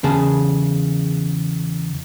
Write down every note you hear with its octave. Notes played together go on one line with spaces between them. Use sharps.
E2 C#3 G#4 A5